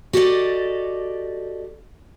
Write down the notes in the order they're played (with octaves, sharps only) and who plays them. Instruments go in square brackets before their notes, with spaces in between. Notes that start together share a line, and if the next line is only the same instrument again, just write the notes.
[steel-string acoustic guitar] F#4 G4 A4 B4 D5 D#5